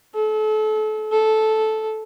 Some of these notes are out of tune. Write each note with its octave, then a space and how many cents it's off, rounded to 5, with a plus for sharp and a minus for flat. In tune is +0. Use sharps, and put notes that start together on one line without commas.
A4 -35
A4 -10